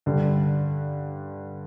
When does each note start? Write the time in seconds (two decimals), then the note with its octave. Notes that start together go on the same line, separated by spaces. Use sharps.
0.06 G2 D3 G3